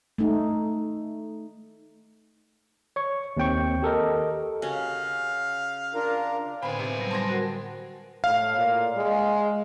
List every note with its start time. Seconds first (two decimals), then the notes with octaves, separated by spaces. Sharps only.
0.18 A3 D#4
2.96 C#5 C#6
3.37 D#2 C4 G5 C#6
3.83 G4 A4 A#4 D#5
4.62 C#3 C#4 F#4 F5
5.95 D4 F4 A#4
6.62 A2 D3 B3 C4 G#5 B5
6.79 C3
6.97 F#3 G3
7.11 A5 C6 A#6
7.29 F#4 A#4 F#5
8.24 A2 F5
8.57 A#2
8.97 G#3